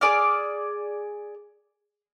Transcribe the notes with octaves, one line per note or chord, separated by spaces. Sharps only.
G#4 D5 D6 F6